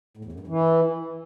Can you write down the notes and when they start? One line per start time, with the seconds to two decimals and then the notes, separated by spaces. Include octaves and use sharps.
0.17 A2
0.25 E2
0.32 F#2
0.40 G2
0.47 E3